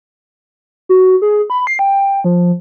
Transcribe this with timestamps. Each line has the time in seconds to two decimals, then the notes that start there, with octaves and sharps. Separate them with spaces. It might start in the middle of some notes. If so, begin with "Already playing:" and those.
0.89 F#4
1.22 G#4
1.50 B5
1.67 C7
1.79 G5
2.24 F3